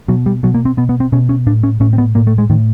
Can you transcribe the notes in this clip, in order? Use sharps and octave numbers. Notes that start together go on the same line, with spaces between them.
B2 F#3
G3
B2 F#3
A#3
C4
B2 B3
B3
C4
B2 C#4
C#4
A2 D4
C#4
A2 C#4
C4
B3
A2 A#3
A3
G#3
A2 D#3